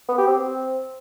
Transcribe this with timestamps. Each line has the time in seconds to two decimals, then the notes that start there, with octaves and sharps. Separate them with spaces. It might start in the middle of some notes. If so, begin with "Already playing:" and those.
0.09 B3
0.18 G4
0.27 C4